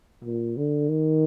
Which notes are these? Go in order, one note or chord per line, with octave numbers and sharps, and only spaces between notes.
A#2
D3
D#3